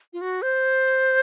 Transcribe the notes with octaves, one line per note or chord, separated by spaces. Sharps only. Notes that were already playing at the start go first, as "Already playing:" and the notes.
F4
F#4
C5